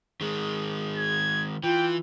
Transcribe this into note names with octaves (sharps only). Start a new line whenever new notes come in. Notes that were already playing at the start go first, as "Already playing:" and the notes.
D#3 G#3 G#4
G#6
E3 F4 G5